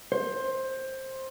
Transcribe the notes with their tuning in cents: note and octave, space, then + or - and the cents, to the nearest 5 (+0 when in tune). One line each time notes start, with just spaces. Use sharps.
C5 +15